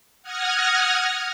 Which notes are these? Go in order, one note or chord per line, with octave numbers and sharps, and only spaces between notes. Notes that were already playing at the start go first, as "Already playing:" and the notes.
F#5 D#6 F6 G#6 A#6